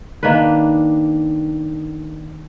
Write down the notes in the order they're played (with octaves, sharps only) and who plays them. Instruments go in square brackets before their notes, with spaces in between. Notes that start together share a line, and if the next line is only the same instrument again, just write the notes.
[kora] D#3 A#3 D4 B4